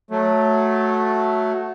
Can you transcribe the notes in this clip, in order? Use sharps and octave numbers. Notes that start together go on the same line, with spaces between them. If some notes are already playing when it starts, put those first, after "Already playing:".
F#3 A3